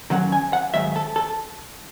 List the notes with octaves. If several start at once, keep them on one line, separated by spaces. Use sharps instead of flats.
F#2 D#3 F#3 C#4 F#5
G#5
F#5
G#2 D#3 F#3 E5
A4
A4